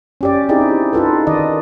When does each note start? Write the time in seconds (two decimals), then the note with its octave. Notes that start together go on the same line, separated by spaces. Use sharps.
0.21 C#4 G4 D5
0.49 C4 D#4 E4 G4 G#4
0.93 D#4 F4 A4 B4
1.27 D#3 D5 D#5